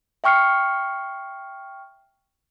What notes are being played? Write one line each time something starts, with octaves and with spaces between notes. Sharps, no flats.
E5 G5 C#6 F6 C7 C#7